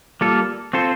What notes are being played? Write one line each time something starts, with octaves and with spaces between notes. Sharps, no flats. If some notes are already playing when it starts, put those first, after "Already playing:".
G3 A#3 F4 A4
C4 F4 A4 C5